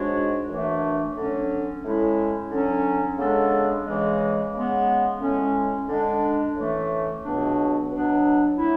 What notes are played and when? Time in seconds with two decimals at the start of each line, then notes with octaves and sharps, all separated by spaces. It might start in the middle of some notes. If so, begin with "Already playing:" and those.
Already playing: G#2 G#3 D4 F#4 C#5
0.48 F#2 E3 A3 D4
1.17 D3 F#3 C#4
1.84 A2 G#3 C#4 E4
2.51 D3 F#3 C#4
3.18 C#3 G#3 B3 D4 A4
3.86 C#3 E3 G#3
4.54 C#3 G#3 B3
5.21 A2 G#3 C#4
5.88 D3 G#3 D4
6.56 A2 E3 A3 C#4
7.24 C#2 B2 F#3 B3 D4
7.91 B2 F#3 B3 D4
8.58 F#3 A3 E4